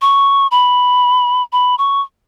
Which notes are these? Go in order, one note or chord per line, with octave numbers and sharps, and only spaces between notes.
C#6
B5
B5
C#6